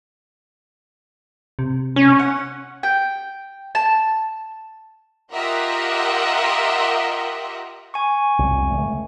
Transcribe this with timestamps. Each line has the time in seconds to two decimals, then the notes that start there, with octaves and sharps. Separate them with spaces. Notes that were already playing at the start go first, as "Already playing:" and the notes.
1.59 C3
1.96 C#4
2.19 F#5
2.83 G5
3.75 A5
5.33 F4 G4 A#4 D#5 E5 F#5
7.94 G#5 C#6
8.39 C2 F2 G3
8.70 C#2 D3 A3